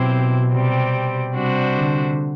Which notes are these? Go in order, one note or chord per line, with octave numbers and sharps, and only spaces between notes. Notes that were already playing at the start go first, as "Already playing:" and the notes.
Already playing: B2 F#3 C4 E4 G4 C5
C3 G3 C4
C3 G3 D4 F#4 C5
D3